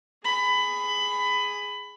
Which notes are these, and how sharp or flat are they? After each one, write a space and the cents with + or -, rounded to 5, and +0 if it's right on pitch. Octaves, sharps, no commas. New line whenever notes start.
G#4 +0 B5 +20